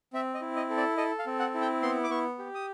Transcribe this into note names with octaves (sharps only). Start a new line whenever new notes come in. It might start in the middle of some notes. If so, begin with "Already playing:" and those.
C4 E5
D#5
E4
D#5
A4
D5
A4 D#5
F5
C4
F#5
E4
G5
B3 C6
D6
B3 C#6
G4
D#6